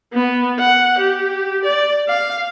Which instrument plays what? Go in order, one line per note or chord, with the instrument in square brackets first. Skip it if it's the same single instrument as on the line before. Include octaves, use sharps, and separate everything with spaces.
[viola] B3
F#5
G4
D5
F5